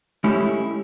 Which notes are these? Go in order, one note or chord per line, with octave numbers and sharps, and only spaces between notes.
G#3 A3 C#4 E4 G4